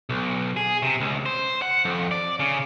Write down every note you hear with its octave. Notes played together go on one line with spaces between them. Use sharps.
B1
G#4
C3
C#2
C5
F#5
F2
D5
C#3